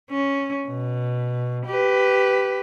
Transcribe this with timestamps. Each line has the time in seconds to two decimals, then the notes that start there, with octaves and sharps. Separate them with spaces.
0.11 C#4
0.68 B2
1.66 G4 B4